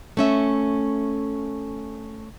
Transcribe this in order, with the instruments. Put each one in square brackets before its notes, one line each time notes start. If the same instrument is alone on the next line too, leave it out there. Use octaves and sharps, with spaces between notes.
[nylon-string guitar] A3 C#4 E5